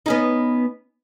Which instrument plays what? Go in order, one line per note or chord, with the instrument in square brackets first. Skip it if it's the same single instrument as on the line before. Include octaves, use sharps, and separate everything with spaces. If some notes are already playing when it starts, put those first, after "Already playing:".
[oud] B3 C#4 D#4